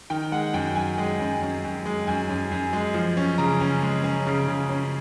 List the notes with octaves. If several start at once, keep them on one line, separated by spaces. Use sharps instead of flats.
D#3 G5
G#3 F#5
F#2 G5
F#2 G#5
G#3
F#2
F#2
F#2
G#3
F#2 G#5
F#2
F#2
G#3
F3
C#4
C#3 A#5
C#4
G#3
C#4
C#3
C#3
C#4